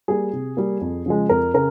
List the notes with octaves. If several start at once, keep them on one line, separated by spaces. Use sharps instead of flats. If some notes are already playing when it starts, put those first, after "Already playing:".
G3 A#3 G#4
C3
G3 A#3
F2
C#3 F3 G#3
F2 A#4
C#3 A#4